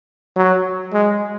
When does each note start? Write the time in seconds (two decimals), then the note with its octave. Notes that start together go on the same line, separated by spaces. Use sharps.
0.36 F#3
0.93 G#3